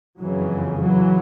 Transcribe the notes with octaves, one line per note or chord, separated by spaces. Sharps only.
F#1 F2 C#3 E3 F#3
E3 F#3